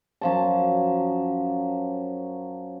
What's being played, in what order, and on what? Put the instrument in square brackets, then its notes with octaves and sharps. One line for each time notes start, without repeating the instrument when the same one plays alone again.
[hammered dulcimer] F#2 F3 A5